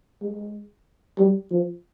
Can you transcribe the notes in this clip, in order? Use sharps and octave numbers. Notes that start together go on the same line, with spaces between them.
G#3
G3
F3